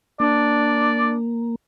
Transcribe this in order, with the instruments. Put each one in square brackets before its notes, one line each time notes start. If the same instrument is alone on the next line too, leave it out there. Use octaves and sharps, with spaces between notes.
[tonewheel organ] A#3 [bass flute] D4 [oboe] D5